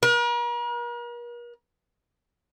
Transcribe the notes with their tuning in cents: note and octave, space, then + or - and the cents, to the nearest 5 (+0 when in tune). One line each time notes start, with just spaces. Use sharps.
A#4 +45